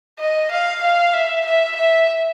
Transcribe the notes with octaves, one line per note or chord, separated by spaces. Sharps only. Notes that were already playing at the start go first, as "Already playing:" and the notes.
D#5
F5
F5
E5
E5
E5